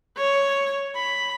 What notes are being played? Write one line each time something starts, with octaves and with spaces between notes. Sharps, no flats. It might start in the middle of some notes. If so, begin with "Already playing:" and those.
C#5
B5